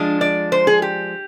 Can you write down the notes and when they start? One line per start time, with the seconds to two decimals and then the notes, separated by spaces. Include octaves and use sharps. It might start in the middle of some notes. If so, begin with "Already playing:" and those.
Already playing: F3 G#3 D4
0.21 D5
0.52 C5
0.67 G#4
0.82 G4